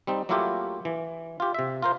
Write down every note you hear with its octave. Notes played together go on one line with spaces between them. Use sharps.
G3 C4 D#4
F#3 A3 A#3 E4 F4 G4
E3
F4 G4
C3 E5
F4 A#4 C5